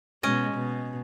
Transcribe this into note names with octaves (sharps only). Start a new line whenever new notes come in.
B2 G#3 C#4 D#5
B2